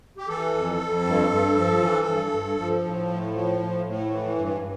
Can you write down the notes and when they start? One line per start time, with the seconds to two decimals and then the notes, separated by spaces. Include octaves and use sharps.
0.18 G4
0.28 E3 A4
0.54 F2
0.80 F2
1.05 G2
1.30 G2
1.56 F3
1.81 E3
2.06 G2
2.32 G2
2.58 F3
2.84 A2
3.08 A2
3.33 F3
3.59 A2
3.85 A2
4.11 E3
4.36 G2